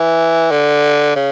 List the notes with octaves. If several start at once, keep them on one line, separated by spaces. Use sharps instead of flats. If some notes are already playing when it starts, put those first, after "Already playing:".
Already playing: E3
D3
C#3